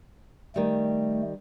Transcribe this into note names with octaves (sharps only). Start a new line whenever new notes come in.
D#3 G3 A3